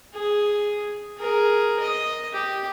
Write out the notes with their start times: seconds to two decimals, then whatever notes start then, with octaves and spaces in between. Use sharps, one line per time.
0.14 G#4
1.18 G#4 A#4
1.79 D#5
2.33 G4